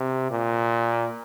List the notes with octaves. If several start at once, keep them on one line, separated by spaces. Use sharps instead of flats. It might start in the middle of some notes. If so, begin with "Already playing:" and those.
Already playing: C3
A#2